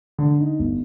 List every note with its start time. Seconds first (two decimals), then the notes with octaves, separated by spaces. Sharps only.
0.18 D3
0.40 D#4
0.59 G1